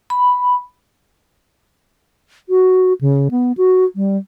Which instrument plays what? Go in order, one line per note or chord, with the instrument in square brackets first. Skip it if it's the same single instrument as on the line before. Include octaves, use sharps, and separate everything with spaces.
[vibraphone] B5
[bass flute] F#4
C#3
B3
F#4
G3